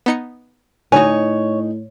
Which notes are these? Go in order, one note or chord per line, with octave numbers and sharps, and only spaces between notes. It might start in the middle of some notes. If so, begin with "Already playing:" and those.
B3 D#4 C#7
A2 D3 D#4 F#4 C#5 G#5